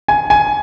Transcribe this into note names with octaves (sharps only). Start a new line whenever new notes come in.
G#5
G#5